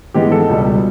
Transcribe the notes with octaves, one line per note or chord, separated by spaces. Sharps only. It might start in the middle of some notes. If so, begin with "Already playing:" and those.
G#2 E3 G#3 B3 G4
A4
C#2 B2 G3